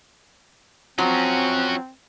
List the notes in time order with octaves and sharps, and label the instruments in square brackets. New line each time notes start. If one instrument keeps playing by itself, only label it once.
[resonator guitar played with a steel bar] F3 F#3 [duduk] C4 [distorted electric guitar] C#4 F#4